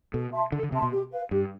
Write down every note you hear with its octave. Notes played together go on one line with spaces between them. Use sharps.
B2 A4
E5 A5 C6
D3 A4
D3
C3 E5 A5 C6
B2
G4
B4 F5
G2 G4